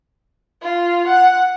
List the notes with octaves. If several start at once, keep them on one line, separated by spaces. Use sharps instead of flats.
F4
F#5